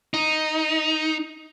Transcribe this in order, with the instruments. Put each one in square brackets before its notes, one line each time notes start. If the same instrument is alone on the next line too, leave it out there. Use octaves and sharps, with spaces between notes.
[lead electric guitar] D#4